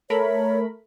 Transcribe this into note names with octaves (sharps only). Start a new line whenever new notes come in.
A3 A#4 C#5 B5